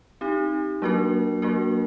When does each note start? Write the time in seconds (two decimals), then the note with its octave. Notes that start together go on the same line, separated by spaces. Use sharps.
0.21 C4 D#4 G4
0.82 F#3 A#3 D4 F#4 A#4
1.42 F#3 A#3 D4 F#4 A#4